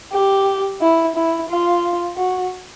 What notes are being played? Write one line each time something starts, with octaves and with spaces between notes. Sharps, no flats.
G4
E4
E4
F4
F#4